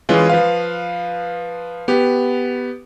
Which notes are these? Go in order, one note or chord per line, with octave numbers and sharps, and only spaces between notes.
E3 G#3 C#4 F4
F3 B4 F5
B3 G4